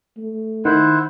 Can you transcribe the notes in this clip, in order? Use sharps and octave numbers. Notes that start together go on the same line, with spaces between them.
A3
D#3 E4 C5 F#5